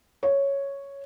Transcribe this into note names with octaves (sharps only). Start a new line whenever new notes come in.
C#5